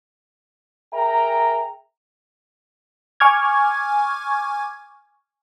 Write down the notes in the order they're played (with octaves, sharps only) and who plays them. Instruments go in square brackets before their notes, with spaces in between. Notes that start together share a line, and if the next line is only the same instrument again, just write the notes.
[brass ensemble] G#4 A#4 E5 G5 A#5
[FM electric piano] G#5 C#6 D6 F6 G#6